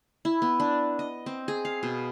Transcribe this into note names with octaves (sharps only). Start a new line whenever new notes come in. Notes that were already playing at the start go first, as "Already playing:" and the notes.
E4
B3
D4
D#5
C4
G#4
F5
B2